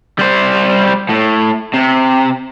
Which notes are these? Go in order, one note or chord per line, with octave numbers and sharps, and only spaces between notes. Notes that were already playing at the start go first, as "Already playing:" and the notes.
G3 C5
A2
C3